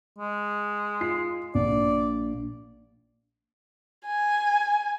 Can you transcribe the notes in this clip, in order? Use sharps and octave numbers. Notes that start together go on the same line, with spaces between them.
G#3
F4 C7
A#1 D5
G#5